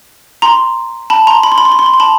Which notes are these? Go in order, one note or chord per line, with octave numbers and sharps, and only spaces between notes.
A#5 C6
A5 B5
A#5 C6
B5
C6
B5
C6
B5
C6
B5
C6
A5 B5